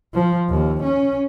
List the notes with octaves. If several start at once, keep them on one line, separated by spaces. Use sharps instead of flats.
F3
D#2
C#4